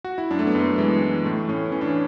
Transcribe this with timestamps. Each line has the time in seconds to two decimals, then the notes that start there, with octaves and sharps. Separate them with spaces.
0.04 F#4
0.18 E4
0.31 F#2 D4
0.39 A3
0.47 B3
0.55 F#2
0.62 A3
0.78 E3 G#3
1.01 E3
1.25 A2 A3
1.49 A2 C#4
1.72 E3 C#4
1.81 D4
1.89 C#4